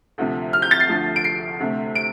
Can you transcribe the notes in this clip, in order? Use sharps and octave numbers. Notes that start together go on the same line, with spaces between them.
D2 C3 F3
F6
G6
A6
C7
D2 D3 F3 A3
D7
C7
D2 C3 A3
D7